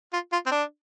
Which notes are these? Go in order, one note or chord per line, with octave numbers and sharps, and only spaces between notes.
F4
F4
C4
D4